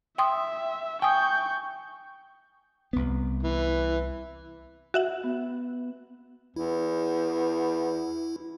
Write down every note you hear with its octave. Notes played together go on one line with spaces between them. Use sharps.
E5 G5 C6 D#6
G5 G#5 C#6 D#6 G6
C2 B3
E3
F#4 E5 F#5
B3
E2 E4